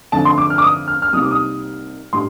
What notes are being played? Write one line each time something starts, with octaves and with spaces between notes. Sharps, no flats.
F2 D3 A3 D4 A5
C6
D6
F6
D6
D#6
F6
F6
C2 C3 G3 A#3 D#4 D#6
D6
D#6
A2 G3 D4 C6